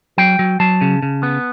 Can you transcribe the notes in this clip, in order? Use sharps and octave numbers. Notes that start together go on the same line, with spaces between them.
F#3 G5
F#3
F#3 A5
C#3
C#3
B3